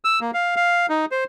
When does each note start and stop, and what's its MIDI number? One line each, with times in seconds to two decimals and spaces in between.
0.05 0.19 88
0.21 0.31 58
0.34 0.55 77
0.56 0.86 77
0.89 1.05 63
1.11 1.24 72